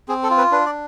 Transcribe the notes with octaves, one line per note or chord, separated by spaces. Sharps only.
C4 G#4
A4
F4
B4
D4 B4
D5